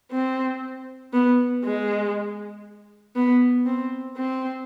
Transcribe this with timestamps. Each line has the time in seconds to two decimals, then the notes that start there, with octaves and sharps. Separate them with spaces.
0.12 C4
1.13 B3
1.64 G#3
3.16 B3
3.66 C4
4.17 C4